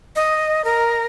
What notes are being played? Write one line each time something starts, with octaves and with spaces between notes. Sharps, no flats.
D#5
A#4